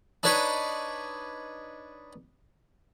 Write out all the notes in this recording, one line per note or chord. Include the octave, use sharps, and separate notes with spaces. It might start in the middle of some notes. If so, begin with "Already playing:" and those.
D4 D#4 B4 C#5